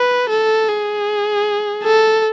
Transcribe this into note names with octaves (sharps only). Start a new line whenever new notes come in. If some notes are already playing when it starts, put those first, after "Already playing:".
Already playing: B4
A4
G#4
A4